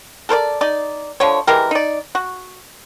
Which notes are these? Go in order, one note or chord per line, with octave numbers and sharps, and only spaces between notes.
A4 A#4 C5 D5
D#4 D5
D3 F3 C#5
E3 G#3 G4 A#4
D#4 D5
F#4